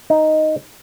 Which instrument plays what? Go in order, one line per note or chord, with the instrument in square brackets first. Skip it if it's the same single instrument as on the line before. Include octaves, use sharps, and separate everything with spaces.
[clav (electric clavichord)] D#4